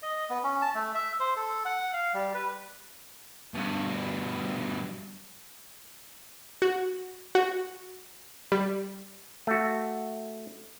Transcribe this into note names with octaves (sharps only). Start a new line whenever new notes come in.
D#5
B3
C#4
A5
A3
E5
C5
A4
F#5
F5
G3
B4
G2 B2
F#4
F#4
G3
A3 F#4